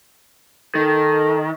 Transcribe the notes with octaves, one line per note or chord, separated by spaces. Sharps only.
D#3 A4